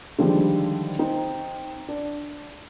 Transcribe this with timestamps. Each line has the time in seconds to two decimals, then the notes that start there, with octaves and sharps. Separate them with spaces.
0.19 D3 D#3 F3 G3 G#3
0.99 C4 D#4
1.88 D4